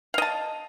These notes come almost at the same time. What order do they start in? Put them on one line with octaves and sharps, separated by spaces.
F5 D#5 A5